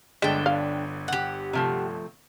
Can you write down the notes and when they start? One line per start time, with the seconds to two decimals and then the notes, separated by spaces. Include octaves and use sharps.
0.22 G1 D3 G#3 D4 G5 B6
0.46 F5
1.08 G4 F#5
1.53 C3 F3 A3